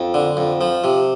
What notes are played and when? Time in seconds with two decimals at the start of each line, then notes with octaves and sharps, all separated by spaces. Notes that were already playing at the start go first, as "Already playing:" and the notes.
Already playing: F2
0.14 D3
0.37 F2
0.61 F3
0.84 C3